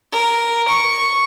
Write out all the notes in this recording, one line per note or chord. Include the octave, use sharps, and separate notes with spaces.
A#4
C#6